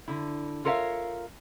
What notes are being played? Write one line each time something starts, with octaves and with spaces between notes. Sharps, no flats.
D3 E4
F4 A4 A#4 C#5 E5 F5